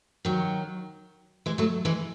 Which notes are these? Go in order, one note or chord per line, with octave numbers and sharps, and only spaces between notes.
D#3 F#3
E3 G#3
F#3 A3
E3 G#3